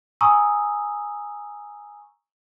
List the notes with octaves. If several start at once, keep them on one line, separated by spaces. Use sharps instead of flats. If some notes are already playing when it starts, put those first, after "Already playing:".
G#5 A#5 C#6 D#6 E6